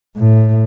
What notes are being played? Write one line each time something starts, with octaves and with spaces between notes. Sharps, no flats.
A2